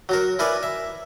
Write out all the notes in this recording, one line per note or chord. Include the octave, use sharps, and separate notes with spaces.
F#3 F#4 A#4
E4 A#4 B4 D5 G#5
E5